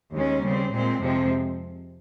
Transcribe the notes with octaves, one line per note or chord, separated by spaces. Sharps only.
D#2 D#3 G#3 C#4
C#3 G3 C4
A#2 G#3 C4
F2 C3 F3 G#3 C4